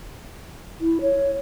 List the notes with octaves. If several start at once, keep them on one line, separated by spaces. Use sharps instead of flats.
E4
C#5